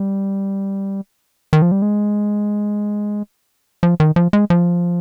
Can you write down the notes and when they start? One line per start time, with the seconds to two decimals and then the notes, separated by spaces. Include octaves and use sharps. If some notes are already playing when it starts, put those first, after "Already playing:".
Already playing: G3
1.53 D#3
1.62 F3
1.72 G3
1.82 G#3
3.83 F3
4.00 D#3
4.16 F3
4.33 G#3
4.50 F3